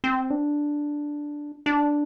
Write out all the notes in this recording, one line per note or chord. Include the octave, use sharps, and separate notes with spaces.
C4
D4
D4